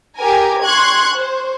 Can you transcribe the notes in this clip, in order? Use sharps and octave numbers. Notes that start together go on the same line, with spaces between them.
G4 A#4 G#5
C6 C#6 F#6 G#6
C5